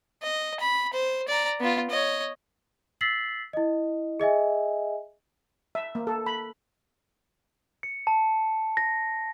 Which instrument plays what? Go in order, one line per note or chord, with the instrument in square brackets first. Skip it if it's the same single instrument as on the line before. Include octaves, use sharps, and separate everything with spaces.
[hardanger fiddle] D#5
B5
C5
D5 A#5
B3 F4
C#5 D#5
[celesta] E6 A6 B6 C7 F#7
E4 D#5
G#4 D#5 E5 G#5
[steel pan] E5
A#3
A4
B5
[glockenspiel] C#7
A5
A#6